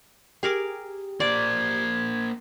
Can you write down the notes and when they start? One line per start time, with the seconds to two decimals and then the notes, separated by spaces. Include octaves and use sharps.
0.43 G4 G#4 A#4 D6
1.20 A#3 C5 D5 G#6